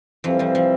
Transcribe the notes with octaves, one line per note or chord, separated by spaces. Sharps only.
F2 C3 E3 F3 G3 C4
F2 F3
F3